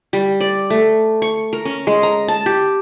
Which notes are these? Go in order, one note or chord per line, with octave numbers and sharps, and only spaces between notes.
G3
D5
A3
C#6
A#4
C#4
G#3
A#5
A5
G4